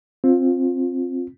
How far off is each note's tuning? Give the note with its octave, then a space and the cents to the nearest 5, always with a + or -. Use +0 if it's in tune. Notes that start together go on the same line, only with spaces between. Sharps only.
C4 +15 F4 +10